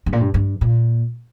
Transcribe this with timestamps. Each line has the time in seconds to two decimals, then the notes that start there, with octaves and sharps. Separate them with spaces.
0.06 G2
0.13 A#2
0.21 G2
0.34 G2
0.61 A#2